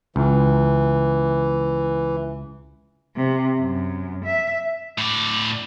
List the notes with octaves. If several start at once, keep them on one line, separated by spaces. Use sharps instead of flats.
C#2 E3
C3
F#2
E5
A2 D5